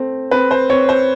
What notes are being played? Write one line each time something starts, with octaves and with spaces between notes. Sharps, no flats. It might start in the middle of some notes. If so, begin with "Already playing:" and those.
Already playing: A3 C4
C4 B4
C5
C4 C#5
C5